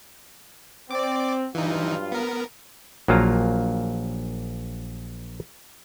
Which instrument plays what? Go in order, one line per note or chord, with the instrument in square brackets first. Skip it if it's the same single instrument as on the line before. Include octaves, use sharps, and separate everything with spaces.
[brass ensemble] C4 [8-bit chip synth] D5 D6
[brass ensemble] G2 F#3 F4 [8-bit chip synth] E3 D#4
[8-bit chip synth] B3 A#4
[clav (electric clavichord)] A#1 F#3 A#3 F4 F5 A#5